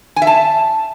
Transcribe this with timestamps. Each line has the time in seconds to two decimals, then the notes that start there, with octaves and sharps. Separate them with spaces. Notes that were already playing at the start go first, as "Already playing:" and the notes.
0.16 G#5
0.22 E5
0.27 A5